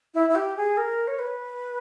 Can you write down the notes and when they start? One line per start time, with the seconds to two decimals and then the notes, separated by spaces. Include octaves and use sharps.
0.14 E4
0.29 E4
0.35 G4
0.57 G#4
0.77 A#4
1.08 C#5
1.19 B4